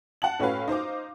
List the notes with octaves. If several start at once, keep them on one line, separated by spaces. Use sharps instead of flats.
F#5 A5 F#7
A2 C#4 F#4 B4 F5
D#4 C5 F5 D6